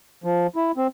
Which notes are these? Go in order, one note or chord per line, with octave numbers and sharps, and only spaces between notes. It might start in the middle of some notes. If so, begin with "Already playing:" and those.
F3
E4
C4